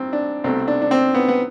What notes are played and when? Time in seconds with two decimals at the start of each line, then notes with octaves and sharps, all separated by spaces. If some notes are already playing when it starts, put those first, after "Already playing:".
Already playing: A1 G2 C4
0.13 D4
0.44 C2 B2 A3 C4
0.68 D4
0.82 D4
0.91 C4
1.15 B3
1.28 B3